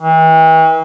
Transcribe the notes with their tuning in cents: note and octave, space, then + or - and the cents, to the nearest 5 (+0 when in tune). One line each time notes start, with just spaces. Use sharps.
E3 -40